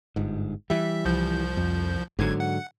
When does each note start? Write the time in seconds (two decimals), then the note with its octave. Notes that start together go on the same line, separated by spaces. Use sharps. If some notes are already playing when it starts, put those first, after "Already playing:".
0.16 G1 G#2
0.70 E3 G3 E5
1.05 C2 F3 G6
1.57 F2
2.19 G1 G#2 D3 F#3 G#6
2.40 F#5